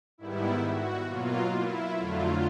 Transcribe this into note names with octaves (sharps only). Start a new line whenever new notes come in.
G#2 D#3 G3 B3 E4
F#4
B2 F#3 A#3 F4
E4
F2 D3 F#3 A3 F4